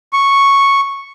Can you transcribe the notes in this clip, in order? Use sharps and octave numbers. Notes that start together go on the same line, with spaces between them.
C#6